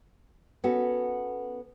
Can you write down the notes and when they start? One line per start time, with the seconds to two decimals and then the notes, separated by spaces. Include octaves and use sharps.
0.64 B3 C#4 F#4 A4